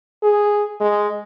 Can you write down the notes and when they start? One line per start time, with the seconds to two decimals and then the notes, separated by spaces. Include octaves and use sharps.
0.23 G#4
0.81 G#3